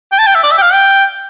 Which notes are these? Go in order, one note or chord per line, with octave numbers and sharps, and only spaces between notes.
G5
A5
G5
E5
D5
E5
G5
F5
G5